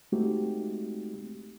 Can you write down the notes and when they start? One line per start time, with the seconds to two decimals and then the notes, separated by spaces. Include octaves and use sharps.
0.12 G#3 A3 C4 D#4 F#4 G4